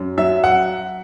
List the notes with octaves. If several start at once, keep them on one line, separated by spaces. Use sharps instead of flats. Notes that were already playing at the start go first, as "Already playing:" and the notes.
Already playing: F#2
F#3 E5
F#5